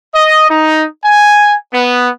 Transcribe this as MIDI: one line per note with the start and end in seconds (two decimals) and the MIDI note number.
0.15 0.50 75
0.50 0.86 63
1.04 1.54 80
1.74 2.09 59